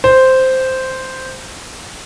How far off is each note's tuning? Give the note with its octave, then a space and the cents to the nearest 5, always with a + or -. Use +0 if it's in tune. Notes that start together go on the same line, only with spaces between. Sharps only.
C5 -5